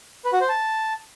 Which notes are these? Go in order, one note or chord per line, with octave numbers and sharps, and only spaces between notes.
B4
F#4
C5
A5